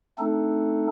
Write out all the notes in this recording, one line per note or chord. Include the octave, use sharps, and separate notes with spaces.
A3 C4 D4 D#4 A4